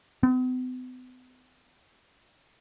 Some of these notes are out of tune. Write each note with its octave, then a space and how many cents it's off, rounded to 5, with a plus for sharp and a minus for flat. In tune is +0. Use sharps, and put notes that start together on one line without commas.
B3 +45